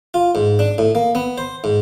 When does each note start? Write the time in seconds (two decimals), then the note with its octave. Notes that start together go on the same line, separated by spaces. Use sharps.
0.14 F4
0.35 G#2
0.59 D4
0.78 A2
0.95 A#3
1.15 B3
1.38 C5
1.64 G#2